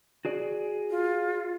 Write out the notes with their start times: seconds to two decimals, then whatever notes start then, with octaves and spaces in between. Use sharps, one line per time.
0.25 F#4 G#4 D5
0.90 F4